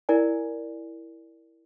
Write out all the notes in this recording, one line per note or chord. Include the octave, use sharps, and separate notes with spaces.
E4 A#4 D5 G#5